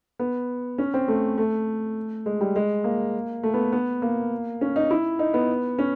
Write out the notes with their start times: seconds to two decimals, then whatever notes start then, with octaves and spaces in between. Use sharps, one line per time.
0.19 B3
0.78 C#4
0.94 C4
1.08 A3
1.38 A3
2.26 G#3
2.41 G3
2.56 G#3
2.84 A#3
3.43 A3
3.54 B3
3.73 B3
4.02 A#3
4.61 C#4
4.76 D#4
4.91 E4
5.19 D#4
5.34 B3
5.79 C#4